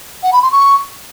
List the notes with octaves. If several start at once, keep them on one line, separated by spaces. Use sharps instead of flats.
F#5
B5
C6
C#6